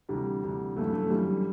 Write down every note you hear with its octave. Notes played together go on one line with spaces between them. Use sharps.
D2 C3 E3 G3
D2 C3 E3
G1 F#2 E3 A3
A3
G1 F#2 E3 G3